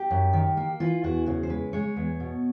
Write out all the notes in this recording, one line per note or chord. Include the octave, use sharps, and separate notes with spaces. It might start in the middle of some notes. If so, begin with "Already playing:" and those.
Already playing: G4
F#2
D#3
A#3
E3 F4
E2 F#4
C#3 F#4
C5
G#3 B4
G#3 C#5
E2
B2